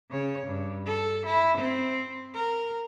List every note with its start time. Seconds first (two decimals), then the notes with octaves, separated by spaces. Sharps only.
0.10 C#3 C#5
0.47 G2
0.86 A4
1.26 E4
1.57 C4
2.34 A#4